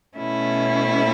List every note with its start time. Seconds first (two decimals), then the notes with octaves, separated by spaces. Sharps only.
0.17 B2 A3 C#4 E4